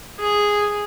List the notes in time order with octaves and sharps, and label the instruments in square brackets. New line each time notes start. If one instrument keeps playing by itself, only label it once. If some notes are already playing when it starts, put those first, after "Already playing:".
[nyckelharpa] G#4